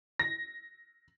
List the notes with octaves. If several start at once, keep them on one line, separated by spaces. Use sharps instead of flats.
A#6